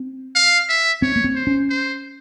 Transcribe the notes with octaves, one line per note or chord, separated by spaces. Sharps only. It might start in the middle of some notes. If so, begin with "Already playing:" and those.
Already playing: C4
F5
E5
C4 C#5
A#3
C4
C5
C#4
C5